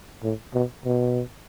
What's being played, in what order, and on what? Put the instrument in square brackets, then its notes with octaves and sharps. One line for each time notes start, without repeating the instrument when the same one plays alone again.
[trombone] A2
B2
B2